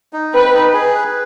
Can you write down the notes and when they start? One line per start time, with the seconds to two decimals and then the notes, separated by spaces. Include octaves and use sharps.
0.13 D#4
0.34 C4 B4
0.53 D#4
0.73 G#4
0.95 B4